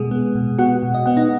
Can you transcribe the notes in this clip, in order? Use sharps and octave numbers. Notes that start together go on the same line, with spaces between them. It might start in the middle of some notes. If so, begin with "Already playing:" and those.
Already playing: B2 G#3 G#4
B3
B2
B3 F#4 F#5
B2
D#5
B3 F#5
D#4 D#5